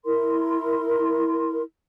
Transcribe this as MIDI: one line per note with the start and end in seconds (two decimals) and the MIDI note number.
0.05 1.62 64
0.05 1.62 70
0.05 1.62 84